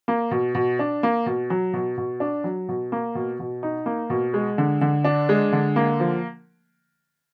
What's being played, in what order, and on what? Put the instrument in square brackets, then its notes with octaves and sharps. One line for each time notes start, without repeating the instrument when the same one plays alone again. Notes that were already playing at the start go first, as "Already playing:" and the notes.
[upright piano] A#3
B2
B2
D4
A#3
B2
F#3
B2
B2
D4
F#3
B2
A#3
B2
B2
D#4
A#3
B2
G#3
D3
D3
D4
G#3
D3
A#3
F3